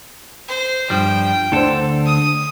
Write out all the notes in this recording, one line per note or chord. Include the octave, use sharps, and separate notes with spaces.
C5
G2 F3 G3 G5
D2 D3 A4 C5
D#6